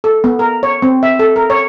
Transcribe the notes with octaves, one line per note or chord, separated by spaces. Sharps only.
A4
B3
A#4
C#5
C4
E5
A4
A#4
C#5